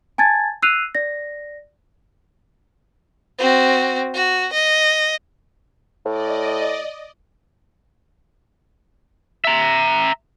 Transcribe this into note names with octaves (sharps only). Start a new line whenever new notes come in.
G#5 A5 G#6 A6
E6 F#6 C7 D#7 F7
D5 A#6
C4 F#4
F#4
D#5
A2 D5 D#5
E5 A#5